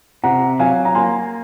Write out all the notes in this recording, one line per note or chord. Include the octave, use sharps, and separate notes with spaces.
C3 F#5 A#5
F#3 F5 G#5
A#5
A#3 G#5 C6